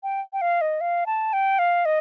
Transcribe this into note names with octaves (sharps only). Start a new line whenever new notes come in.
G5
G5
F5
D#5
F5
A5
G5
F5
D#5